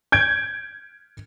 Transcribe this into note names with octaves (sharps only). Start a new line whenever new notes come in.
G6 G#6 D7